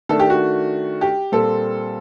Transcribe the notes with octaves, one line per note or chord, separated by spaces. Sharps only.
D#3 A3 D4 A4
G4
F#4
G4
A#2 G3 C4 A4